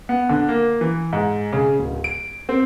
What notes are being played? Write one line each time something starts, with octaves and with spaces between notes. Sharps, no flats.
B3
D3
A#3
E3
G#2
C#3
D1
D7
C4